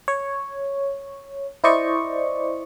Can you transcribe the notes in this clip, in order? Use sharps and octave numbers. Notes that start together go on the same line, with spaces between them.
C#5
E4 C5 D5 D#5 C#6